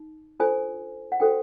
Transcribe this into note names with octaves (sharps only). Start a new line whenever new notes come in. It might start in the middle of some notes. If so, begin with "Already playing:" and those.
Already playing: D#4
D4 F4 A4 C5 G#5
F#5
D4 F#4 A4 C5 G5